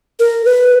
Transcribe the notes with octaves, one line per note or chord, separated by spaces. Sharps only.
A#4
B4